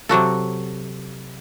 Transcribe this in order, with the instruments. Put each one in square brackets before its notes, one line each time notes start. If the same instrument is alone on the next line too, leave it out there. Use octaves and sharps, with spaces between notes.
[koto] C3 F#3 F#4 A4